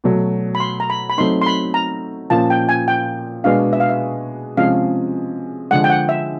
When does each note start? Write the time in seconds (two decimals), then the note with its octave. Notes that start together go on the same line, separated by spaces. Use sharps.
0.04 B2 F#3 A3
0.55 B5
0.60 C6
0.80 A#5
0.90 B5
1.10 B5
1.17 F#3 A3 C4 D#4 C6
1.42 C6
1.46 B5
1.74 A#5
2.30 A#2 F3 A#3 C#4 F4 A5
2.50 G5
2.69 G#5
2.88 G5
3.44 B2 G#3 B3 D4 F#4 F5
3.73 E5
3.80 F5
3.90 E5
4.57 C3 F3 G#3 C#4 F5
5.71 D3 F3 G#3 F#5
5.84 G5
5.90 F#5
6.09 E5